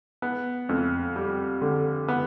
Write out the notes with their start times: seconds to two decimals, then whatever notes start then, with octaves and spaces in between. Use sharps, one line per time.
0.22 B3
0.69 F2
1.16 G3
1.62 D3
2.08 B3